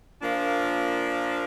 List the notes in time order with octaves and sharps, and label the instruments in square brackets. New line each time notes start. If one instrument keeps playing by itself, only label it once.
[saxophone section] A#2 F3 A#3 D4